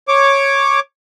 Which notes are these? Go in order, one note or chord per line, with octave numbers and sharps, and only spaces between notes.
C#5 D6